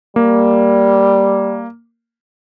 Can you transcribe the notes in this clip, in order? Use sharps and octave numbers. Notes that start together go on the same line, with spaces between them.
G3 A#3